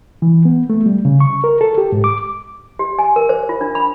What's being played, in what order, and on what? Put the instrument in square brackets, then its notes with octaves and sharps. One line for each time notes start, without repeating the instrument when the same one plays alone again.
[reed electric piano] E3
B3
A3
G3
C#3
C#6
A#4
A4
G4
G#2
D6
[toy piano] G4
G#5
A#4
C5
F4
D4
B5